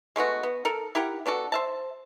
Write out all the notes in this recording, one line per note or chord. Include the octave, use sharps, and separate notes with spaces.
G#3 A3 B3 F#4
B3
A4 A#4
E4 G4 A#4 F#5
B3 D4 F#4 A4
C5 E5 A5